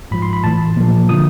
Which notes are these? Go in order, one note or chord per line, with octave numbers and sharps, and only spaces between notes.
G#2 F3 B5
C6
B5
A2 E3 A5
A#2 F3
D3 F3 D#6